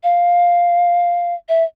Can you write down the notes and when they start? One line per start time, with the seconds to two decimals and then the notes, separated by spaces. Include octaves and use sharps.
0.03 F5
1.49 E5